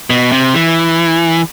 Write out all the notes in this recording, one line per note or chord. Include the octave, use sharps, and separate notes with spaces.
B2
C3
E3